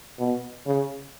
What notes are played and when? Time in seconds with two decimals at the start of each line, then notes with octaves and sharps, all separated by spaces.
0.19 B2
0.66 C#3